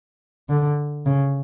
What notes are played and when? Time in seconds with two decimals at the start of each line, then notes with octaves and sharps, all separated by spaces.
0.49 D3
1.06 C#3